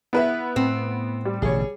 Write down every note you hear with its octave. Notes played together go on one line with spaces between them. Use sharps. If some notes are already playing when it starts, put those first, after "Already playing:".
B3 E4 B4 E5
A2 C4
G3
A1 B2 D3 G#4 C#5